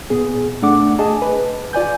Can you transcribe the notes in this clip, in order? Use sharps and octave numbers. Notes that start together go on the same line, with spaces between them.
A#2 B3 G#4
A3 D4 F#5 D6
G#4 D#5 G#5 A5
B4
F4 D5 G#5 G6